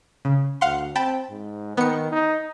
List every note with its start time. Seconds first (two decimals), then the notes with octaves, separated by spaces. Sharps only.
0.25 C#3
0.61 D2 F5 F#5 C6
0.96 C4 G5 A5 B5
1.30 G#2
1.77 D#3 B3 C#7
2.12 D#4